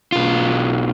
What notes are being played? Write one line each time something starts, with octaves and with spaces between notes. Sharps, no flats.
B1 F4